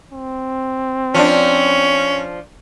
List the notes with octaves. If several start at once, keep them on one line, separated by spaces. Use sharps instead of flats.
C4
F3 C#4 D4